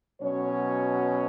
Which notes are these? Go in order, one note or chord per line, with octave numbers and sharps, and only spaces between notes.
B2 F#3 C#4 C#5